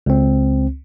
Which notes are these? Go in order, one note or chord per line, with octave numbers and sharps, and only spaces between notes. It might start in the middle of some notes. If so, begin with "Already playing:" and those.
C#2 C4